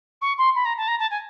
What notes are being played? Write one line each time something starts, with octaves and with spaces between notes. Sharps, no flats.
C#6
C6
B5
A#5
A5
A#5
A5
G#5